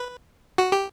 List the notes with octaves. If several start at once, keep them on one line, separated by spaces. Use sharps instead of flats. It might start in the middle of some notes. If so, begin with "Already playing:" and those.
Already playing: B4
F#4
G4